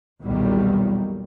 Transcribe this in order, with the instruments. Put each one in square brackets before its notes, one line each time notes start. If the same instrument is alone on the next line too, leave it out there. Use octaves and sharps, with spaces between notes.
[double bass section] B1 E2 A#2 D#3 F#3 G3